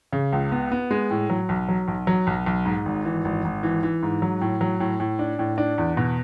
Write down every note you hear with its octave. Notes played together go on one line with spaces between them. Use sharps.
C#3
C#2
B3
B3
G#3
A2
F#3
B1
F#3
B1
F#3
B1
B1
G#2
G#1
E3
G#1
G#1
E3
E3
G#2
F#3
A2
F#3
A2
A2
D4
A2
D4
E2
B2